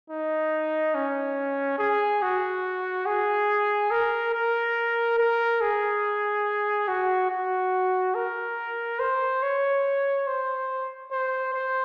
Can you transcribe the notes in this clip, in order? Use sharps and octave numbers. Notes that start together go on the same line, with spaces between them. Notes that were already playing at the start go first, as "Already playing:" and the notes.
D#4
C#4
G#4
F#4
G#4
A#4
A#4
A#4
G#4
F#4
F#4
A#4
C5
C#5
C5
C5
C5